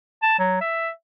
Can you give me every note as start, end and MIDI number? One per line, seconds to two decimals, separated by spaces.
0.23 0.34 81
0.39 0.59 54
0.61 0.90 76